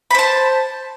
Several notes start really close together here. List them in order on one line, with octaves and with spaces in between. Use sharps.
B5 C5 A5